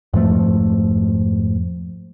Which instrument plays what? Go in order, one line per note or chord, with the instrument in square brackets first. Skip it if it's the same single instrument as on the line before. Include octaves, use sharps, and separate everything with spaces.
[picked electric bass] F2 G#2 F3 A3